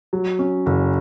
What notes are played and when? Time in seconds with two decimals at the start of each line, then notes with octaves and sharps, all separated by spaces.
0.13 F#3
0.39 C#4
0.66 F#1